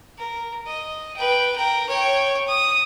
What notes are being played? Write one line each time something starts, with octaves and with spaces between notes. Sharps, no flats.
A#4
D#5
B4 G5
A#4 G5
C#5 G5
D#6